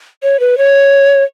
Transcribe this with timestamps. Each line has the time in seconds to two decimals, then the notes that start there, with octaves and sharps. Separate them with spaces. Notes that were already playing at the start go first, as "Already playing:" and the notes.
0.23 C#5
0.40 B4
0.58 C#5